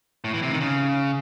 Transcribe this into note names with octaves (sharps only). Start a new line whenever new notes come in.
A2
E3
C3
D#3
C#3